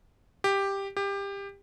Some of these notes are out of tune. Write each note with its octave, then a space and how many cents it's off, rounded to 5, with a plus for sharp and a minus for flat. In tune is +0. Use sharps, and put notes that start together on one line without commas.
G4 +5
G4 +20